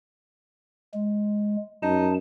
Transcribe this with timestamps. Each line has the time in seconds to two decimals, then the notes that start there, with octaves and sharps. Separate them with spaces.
0.94 G#3
1.83 F#2 D#4 A5